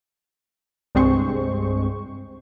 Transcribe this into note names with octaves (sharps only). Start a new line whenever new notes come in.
C2 G2 G#3 C4 C5 C#6